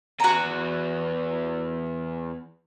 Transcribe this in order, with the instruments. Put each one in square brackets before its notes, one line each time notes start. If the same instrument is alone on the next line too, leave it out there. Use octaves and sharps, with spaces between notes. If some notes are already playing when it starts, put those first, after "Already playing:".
[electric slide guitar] E2 F#5 G#5 [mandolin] F#4 A#5